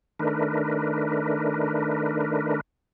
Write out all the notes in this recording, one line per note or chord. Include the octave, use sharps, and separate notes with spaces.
D#3 A3 D4 A#4 B4